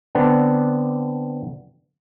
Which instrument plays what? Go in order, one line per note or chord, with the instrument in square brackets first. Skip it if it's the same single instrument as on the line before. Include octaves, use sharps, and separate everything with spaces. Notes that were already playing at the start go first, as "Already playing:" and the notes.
[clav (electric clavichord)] D3 B3 C4 D4